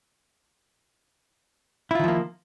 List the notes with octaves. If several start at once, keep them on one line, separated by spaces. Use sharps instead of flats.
D#3 F3 A#3 E4 F4